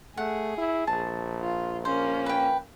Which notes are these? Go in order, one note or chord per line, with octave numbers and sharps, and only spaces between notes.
A3 G#4 F#5
E4
A#1 A5
F4
A#3 C#4 C5
B4 G5